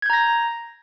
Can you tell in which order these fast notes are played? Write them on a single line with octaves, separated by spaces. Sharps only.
G#6 G6 A#5 A#6